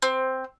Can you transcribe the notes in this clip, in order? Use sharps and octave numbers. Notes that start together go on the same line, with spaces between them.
C4